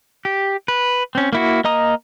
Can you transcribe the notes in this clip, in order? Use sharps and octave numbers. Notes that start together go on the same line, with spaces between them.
G4
B4
C4 C#4
A#3 E4 F#4
A#3 D#5 A#5 D#6